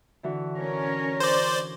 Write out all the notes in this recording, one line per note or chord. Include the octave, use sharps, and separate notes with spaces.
D3 E3 F#4
C#4 A#4 C#5
C5 D5